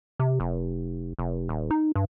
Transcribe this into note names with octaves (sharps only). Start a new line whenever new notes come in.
C3
F1
F1
D#1
D#4
G2